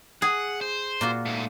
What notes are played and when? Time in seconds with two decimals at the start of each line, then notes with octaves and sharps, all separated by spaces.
0.22 G#4 F#5
0.61 C5
1.01 A#2 F4 F#4
1.26 G#2 A3